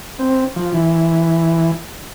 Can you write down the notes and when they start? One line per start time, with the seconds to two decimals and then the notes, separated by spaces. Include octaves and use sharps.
0.19 C4
0.56 F3
0.74 E3